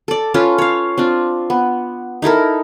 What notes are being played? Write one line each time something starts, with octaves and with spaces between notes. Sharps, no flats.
A4 D5
C#4 F4 A4 B4
C#5 F5
C4 D4 F4
B3
D#4 E4 A4 A#4